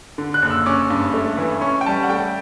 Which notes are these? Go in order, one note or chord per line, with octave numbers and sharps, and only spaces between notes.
D3
F#6
F#1
E6
C#4 D6
G2
A3
E3
C#4 C#6
G5
G3 A5
F#5
A3 G5